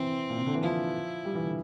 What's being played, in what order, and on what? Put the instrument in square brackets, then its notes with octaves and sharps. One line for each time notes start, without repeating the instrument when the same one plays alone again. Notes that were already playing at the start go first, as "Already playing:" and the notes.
Already playing: [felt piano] C3 E3 [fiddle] C4
[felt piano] A#2
C3
D3
E3
[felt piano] F3 [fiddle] E4
[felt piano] G3
E3
D3